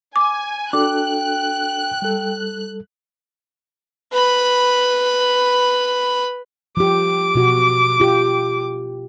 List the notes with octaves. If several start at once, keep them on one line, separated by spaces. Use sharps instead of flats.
G#5 D6
D4 F#4 A4 G5 D6 F#6
G3 A4
B4 B5
F3 G4 D6
B2 F#4
F4 G4